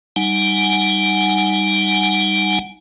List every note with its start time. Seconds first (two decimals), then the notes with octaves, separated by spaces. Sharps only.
0.16 G3 D#4 F#5 G#5